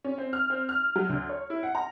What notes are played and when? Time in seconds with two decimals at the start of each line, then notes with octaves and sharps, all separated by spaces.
0.05 C#4
0.18 C4
0.33 F6
0.50 C4
0.69 F6
0.96 F#3
1.09 D2
1.29 C#5
1.50 E4
1.63 F#5
1.75 A#5